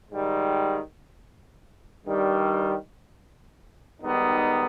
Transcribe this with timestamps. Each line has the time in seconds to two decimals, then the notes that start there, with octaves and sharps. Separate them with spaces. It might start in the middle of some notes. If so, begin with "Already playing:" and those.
0.10 G#2 D#3 G3
2.06 G2 D#3 G3
4.02 G#2 D#3 G3 B3 D#4